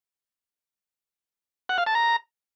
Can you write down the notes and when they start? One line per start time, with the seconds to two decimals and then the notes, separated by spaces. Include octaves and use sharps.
1.69 F#5
1.78 F5
1.86 A5
1.95 A#5